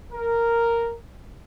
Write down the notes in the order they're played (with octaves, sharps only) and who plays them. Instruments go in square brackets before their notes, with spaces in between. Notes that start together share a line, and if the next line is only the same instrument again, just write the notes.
[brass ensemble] A#4